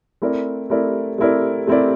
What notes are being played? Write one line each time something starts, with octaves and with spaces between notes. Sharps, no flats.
A3 C4 E4 A#4 D5
A3 C4 E4 A#4 D5
A3 C4 E4 A#4 D5
A3 C4 E4 A#4 D5